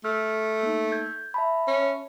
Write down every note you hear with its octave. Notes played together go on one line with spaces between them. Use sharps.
A3 F6
A#3 D#4
G6 G#6
E5 A5 B5
C#4